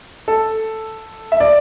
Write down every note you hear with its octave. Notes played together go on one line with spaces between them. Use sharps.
A4
E5
D5